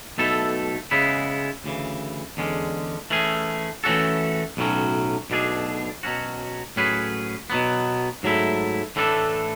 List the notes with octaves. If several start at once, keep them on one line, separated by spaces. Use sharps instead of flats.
B1 B2 A3 E4 A4
C#3 G#3 B3 E4
D2 C#3 E3
E2 D3 G#3 C#4
E3 A3 C#4 G#4
E3 A3 C#4 F#4 A4
B1 A2 F#3 C#4
B1 B2 A3 D4 G#4
B2 F#3 C#4 F#4
A2 F#3 C#4 G#4 B4
B2 F#3 B3
G#2 F#3 A3 E4
A2 E3 A3 D4 A4